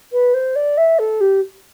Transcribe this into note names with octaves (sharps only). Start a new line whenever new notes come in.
B4
C5
D5
E5
A4
G4